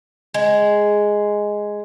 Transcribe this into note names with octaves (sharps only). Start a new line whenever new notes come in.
G#3